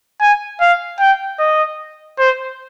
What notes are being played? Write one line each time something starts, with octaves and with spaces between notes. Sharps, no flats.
G#5
F5
G5
D#5
C5